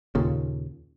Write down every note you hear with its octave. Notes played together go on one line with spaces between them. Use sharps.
D#2 A#2 C#3